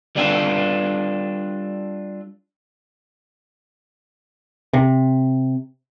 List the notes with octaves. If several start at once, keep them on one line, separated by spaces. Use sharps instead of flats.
G3 D4 F4 A4
C3